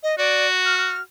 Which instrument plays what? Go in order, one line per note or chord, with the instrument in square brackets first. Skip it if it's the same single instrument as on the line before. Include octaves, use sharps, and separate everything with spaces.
[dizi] D#5
[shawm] F#4 [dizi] D5
[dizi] F6
F6